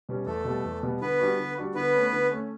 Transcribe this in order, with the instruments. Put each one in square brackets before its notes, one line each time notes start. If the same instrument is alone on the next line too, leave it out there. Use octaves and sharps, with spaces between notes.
[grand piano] B2 G3 C#4
[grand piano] E2 [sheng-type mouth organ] A3 A4
[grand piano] B2 G3 B3
E2
B2 G3 B3
[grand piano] D3 [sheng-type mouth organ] B3 B4
[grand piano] G3 D4 F#4
D3
G3 D4 F#4
[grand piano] D3 [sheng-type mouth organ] B3 B4
[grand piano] A3 C#4
D3
A3 C#4